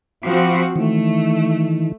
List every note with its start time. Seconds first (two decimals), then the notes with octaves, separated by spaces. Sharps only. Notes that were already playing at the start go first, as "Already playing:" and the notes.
0.23 F3 C4 F#4 B5 C6 D6
0.76 D#3 E3 A3